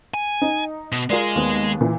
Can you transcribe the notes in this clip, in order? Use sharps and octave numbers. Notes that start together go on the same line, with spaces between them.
G#5
D#4
B2
G#3 F4 G#4 A#4 D5
D#2 B3
A#2 E3